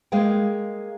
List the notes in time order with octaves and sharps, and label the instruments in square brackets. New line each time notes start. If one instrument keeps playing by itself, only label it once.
[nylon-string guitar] G#3 A#3 G#4 F5 G5